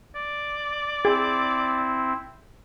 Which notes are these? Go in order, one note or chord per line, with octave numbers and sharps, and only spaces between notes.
D5
C4 E4 G#4